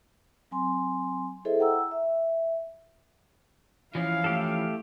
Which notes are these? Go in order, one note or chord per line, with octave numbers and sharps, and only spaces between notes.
F#3 C4 G#5 C6
E4 G#4 A4 C5 D#5 E5
F#5 G5 A#5 E6
E5
E3 F3 C#4 E4 F5
A3 G4 A4